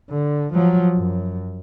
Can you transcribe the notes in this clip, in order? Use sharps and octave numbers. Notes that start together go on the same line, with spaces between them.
D3
F3 F#3
F#2